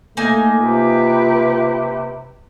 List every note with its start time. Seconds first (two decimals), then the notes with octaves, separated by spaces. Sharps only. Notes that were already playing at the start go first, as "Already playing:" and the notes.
0.17 A3 A#3 D#4 G#5
0.59 C3 F4 B4 G5